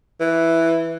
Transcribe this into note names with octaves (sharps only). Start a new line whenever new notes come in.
E3